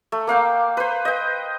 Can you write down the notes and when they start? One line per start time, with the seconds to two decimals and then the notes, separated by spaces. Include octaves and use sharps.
0.12 A3
0.27 A#3 F5 G5 D6
0.77 B4 C5
1.05 D#5 G5